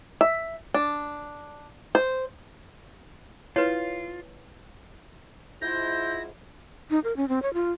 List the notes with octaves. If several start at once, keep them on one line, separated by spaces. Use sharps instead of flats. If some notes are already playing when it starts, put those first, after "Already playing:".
E5
D4
C5
E4 F4 B4 C#5
G#2 E4 F4 G6 A#6
D#4
A#4
C#4
C4
C#5
F4